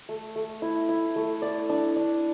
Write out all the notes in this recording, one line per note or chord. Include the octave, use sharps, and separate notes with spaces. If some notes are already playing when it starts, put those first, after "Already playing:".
A3
A3
E4
E4
A3
D5
D4
D4